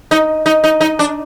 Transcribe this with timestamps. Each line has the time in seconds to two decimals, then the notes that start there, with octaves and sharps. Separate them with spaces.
0.11 D#4
0.46 D#4
0.64 D#4
0.81 D#4
0.99 D4